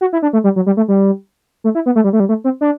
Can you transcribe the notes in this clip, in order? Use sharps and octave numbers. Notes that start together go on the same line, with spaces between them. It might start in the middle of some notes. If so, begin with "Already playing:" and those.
F#4
E4
D4
A3
G3
F#3
G3
A3
G3
A3
E4
B3
A3
G3
A3
G3
A3
C4
D4